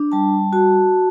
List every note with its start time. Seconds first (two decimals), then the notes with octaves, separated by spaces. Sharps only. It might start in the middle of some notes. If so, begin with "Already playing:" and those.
Already playing: D4
0.12 G3 A5
0.53 F#4 A5